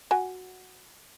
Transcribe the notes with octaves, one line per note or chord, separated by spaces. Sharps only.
F#4 G#5